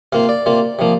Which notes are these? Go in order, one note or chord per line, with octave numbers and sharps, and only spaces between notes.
C3 A#3 F4 F5
D5
C3 A#3 F4
C3 F3 A#3